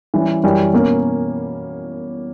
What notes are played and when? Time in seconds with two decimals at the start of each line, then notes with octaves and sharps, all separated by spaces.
0.14 E3 G3 C#4
0.43 F#2 E3 G3 C#4 G4
0.73 B2 A#3 C#4